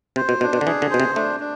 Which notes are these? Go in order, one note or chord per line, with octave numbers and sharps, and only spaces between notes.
C3 C5
B2
B2 D4
B2
D3
E3 G#4
D3
B2 C5
C3
A3 D4
D4